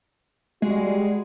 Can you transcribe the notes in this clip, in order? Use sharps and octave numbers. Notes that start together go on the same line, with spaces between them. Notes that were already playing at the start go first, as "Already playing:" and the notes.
G3 G#3 F#4